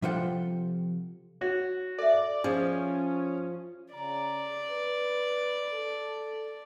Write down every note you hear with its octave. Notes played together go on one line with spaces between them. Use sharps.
C3 F3 F4 A4 F#5 G5
F#4 C#5
A4 D5 E5
F3 C#4 G#4
C#3 D5 A#5
B4
A4